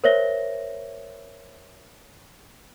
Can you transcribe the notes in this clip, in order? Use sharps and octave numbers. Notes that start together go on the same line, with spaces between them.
A#4 C5 C#5 E5 A#6 G7